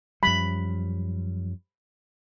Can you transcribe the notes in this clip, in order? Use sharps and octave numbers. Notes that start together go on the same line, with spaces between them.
F#2 F3 G3 B5